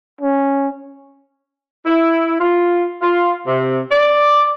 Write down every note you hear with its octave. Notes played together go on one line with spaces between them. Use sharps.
C#4
E4
F4
F4
C3
D5